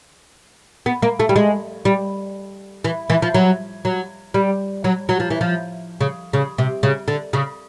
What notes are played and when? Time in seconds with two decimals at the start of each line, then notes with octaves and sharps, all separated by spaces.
0.86 B3
1.02 A#3
1.20 A3
1.29 G3
1.36 G#3
1.85 G3
2.84 E3
3.10 E3
3.22 F3
3.34 F#3
3.85 F#3
4.34 G3
4.84 F#3
5.09 F#3
5.20 F3
5.30 E3
5.41 F3
6.01 C#3
6.33 C#3
6.58 C3
6.83 C#3
7.08 D3
7.33 C#3